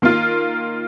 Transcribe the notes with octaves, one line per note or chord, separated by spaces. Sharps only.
D#3 A#3 F4